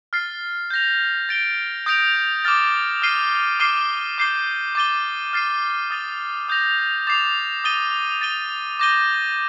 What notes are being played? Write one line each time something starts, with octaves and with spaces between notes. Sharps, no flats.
F6 A6 C7
G6 A#6 F7
A6 D7 G7
D#6 G6 A#6 D7 F7
D6 F6 A6
F6 C7 D#7 G7
D6 F6 C7 D#7 G7
D6 G6 C7 D#7 G7
D6 A6 D#7 G7
F6 A6 C7 D#7
D#6 A6 D#7 G7
D#6 G6 A#6 F7
D6 A6 C7 F7
D#6 A6 D#7 G7
A6 D#7 G7
D6 G6 A#6 D#7 G7